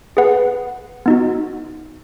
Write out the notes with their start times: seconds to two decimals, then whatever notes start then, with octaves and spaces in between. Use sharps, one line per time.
0.17 G#4 B4 F#5
1.06 B3 D#4 F#4